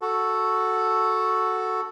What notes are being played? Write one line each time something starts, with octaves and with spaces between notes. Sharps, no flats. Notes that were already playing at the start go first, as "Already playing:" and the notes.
F#4 A4